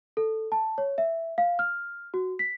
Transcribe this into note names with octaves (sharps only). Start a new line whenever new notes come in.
A4
A5
C#5
E5
F5
F6
F#4
B6